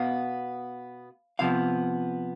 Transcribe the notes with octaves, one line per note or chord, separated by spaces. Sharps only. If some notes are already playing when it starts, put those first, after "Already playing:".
Already playing: B2 B3 F5
C3 F3 B3 F5